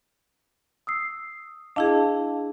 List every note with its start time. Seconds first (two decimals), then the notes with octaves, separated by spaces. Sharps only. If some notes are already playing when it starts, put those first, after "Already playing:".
0.87 D#6 E6 C7
1.76 D4 E4 G#4 D#5 F5 A5